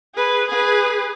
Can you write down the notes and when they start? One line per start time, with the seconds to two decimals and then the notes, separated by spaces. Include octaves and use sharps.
0.15 G#4 B4
0.48 G#4 B4